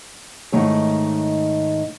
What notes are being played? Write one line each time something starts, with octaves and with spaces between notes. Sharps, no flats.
G#2 D#3 A3 G#4 C#5